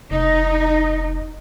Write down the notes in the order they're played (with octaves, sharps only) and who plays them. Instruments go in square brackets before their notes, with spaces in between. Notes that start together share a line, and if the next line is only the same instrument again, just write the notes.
[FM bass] F1 [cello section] D#4